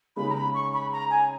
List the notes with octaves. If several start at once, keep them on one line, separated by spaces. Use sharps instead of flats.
C#3 G#3 D#4 B5
A#5
B5
C#6
B5
A#5
G#5